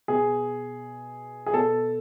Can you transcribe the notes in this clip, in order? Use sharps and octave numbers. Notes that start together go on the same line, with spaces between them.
B2 G#4
G#4
B2 A4